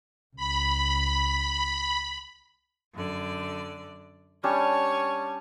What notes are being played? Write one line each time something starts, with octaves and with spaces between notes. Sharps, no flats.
C#2 B5
F#2 D3 D5
G3 C#4 D4 C#5 G#5 A5